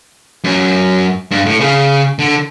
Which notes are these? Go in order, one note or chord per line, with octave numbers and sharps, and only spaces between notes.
F#2
G2
A2
C#3
D3